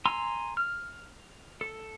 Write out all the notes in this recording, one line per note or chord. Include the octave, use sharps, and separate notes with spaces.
G#5 A#5 C6 E6
F6
A4